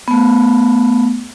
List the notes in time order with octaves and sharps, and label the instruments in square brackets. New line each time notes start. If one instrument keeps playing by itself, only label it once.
[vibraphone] A3 B3